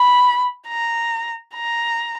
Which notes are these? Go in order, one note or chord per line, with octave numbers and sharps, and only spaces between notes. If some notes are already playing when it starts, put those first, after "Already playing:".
Already playing: B5
A#5
A#5